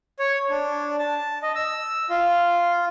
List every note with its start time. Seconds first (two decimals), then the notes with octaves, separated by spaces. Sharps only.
0.19 C#5
0.50 D4
0.99 A5
1.43 D#5
1.56 E6
2.09 F4